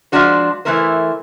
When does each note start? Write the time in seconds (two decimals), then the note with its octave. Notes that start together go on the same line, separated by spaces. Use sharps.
0.12 F3 F#3 G#3 D4 F#4 C5
0.65 E3 F#3 A3 E4 A#4 C5